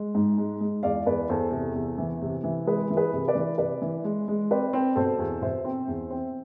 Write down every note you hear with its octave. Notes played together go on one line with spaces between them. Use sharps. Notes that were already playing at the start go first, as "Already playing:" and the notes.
Already playing: G#3
G#2
G#3
G#3
E2 D5 F5
E2 B4 D5
E2 A4 C5
C3 A4
E2
E3
C3
E3
G#3 G#4 B4
E3
G#4 B4
C3
B4 D5
E3
C3 B4 D5
E3
G#3
G#3
C4 B4 D5
C4
B2 A4 C5
E2
B2 C5 E5
C4
E2
C4